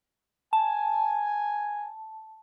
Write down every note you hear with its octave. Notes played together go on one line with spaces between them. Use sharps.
G#5 A5